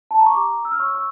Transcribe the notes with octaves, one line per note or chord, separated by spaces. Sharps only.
A5
A#5
C#6
G4 A#5 D6
E6
F6
C#5 C#6 E6
C#6 E6